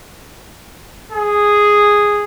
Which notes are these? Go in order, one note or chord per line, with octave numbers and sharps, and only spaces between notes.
G#4